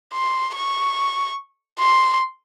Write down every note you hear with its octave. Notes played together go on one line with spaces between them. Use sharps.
C6
C#6
C6